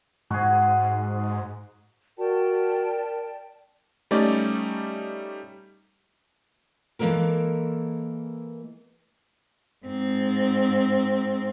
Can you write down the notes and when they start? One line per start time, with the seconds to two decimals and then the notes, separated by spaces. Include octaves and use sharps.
0.30 G#2 F#4 G#4
2.18 F#4 A#4 D5 G5 A5
4.11 G3 A3 C#4 D#4 D5
6.99 E3 G#3 A#3 A4 A#4
9.86 G#2 C4